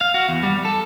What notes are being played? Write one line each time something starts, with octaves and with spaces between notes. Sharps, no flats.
F5
F#4
E2
G3
A4